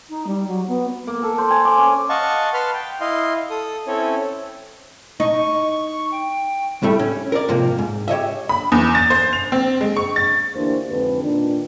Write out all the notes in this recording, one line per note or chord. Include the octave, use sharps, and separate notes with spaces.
D#4
G3
F#3
B3
A#3
A4
C5
G#5
D6
C#4
D#5 F5 F#5 A5 C#6
B4 A5 B5 C6 F6
G5
E4 D#5 F5 C6
A4 D#6
C4 C#4 E4 A4 C#5
D#4 C#6
G5
A2 G3 A3
C#4
A#4 D5
G#2 C3 F3 A#3
G#2
G4 C#5 D#5 E5
B5
E2
A6
C5
F7
C4
G#3
C#6
A6
D2 E3 A#3 D4 G4 C5
F2 G#2 D3 C4 B4
A#2 D#3 D4